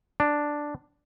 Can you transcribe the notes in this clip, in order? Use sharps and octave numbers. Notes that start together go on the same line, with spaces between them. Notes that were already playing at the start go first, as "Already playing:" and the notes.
D4